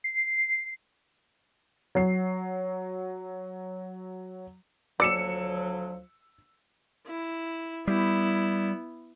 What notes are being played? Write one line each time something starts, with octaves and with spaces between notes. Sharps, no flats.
C7
F#3 C7
D2 F3 F#3 D5 E6 C#7 E7
E4
G3 B3 E4